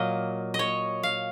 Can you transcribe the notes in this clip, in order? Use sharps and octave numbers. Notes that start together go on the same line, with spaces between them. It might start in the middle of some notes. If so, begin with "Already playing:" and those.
Already playing: A#2 F#3 A#3 D#5
D#5
C#5
F5